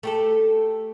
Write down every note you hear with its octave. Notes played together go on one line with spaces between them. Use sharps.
A3 G4 A4